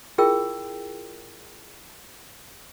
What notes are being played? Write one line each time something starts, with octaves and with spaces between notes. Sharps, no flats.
E4 F4 G#4 A#4 G5 E6